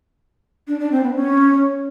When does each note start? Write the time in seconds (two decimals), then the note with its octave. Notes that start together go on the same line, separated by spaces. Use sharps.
0.68 D4
0.80 D4
0.91 C4
1.03 B3
1.15 C#4